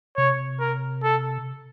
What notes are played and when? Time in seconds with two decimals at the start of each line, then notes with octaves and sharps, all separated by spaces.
0.17 C3 C#5
0.60 A#4
1.03 A4